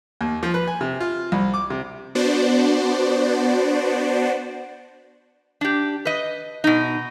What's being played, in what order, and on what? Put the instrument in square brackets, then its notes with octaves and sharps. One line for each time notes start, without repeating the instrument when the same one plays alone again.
[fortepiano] D#2
F3
B4
G#5
C3
F4
C2
D6
C3
[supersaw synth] B3 D4 F#4 C5 D5
[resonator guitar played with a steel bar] D4 G4
B4 D#5
B2 D#4